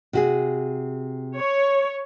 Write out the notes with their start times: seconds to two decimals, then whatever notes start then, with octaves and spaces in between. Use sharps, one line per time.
0.13 C3 F#4 G#4
1.37 C#5